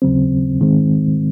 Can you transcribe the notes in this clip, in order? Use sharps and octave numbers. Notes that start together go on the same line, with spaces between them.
D#2 C#3 F#3 C4
G#2 D#3 G#3 C4